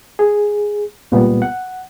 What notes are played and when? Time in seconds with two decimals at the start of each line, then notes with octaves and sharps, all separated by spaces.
0.19 G#4
1.12 C#2 A#2 G3 B3
1.42 F#5